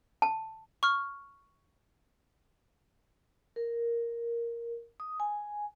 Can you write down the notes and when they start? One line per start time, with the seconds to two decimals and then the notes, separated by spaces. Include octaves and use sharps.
0.22 A5
0.83 C#6 F6
3.56 A#4
5.00 D#6
5.20 G#5